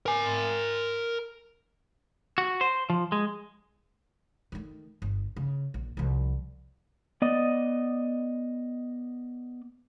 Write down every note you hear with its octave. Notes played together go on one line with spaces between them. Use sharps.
A#4 G#5
F#4
C5
F3
G#3
D#3 A3
G1
C#3
A#1
C2 F3
B3 D5 D#5